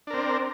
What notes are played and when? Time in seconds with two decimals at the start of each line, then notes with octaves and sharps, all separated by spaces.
0.07 D4
0.10 A#4
0.13 C4